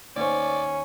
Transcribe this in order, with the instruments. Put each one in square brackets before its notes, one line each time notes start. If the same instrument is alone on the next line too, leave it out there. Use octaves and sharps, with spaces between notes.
[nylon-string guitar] D#2 C5 [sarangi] C#4 [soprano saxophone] D5